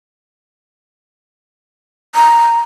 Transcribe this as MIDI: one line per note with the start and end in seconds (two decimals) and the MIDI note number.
2.15 2.60 82